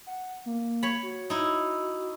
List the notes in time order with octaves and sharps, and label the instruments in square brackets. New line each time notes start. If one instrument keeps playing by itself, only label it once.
[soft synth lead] F#5
A#3
[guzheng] C#5 B5
[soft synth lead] F#4
[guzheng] D#4 E4